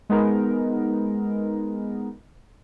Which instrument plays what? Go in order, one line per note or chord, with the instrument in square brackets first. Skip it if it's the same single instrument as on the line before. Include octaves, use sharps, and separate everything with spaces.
[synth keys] G#3 B3 D#4 A#4